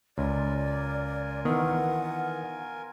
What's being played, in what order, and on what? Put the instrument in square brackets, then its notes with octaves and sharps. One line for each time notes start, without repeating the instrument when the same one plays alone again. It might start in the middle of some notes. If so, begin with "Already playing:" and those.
[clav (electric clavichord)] C#2 [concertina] F4 A#4 G#5 [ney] D5
[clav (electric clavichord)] D#3 E3 [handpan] B3 [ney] F#5